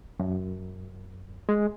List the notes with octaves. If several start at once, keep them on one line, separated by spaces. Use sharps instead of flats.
F#2
G#3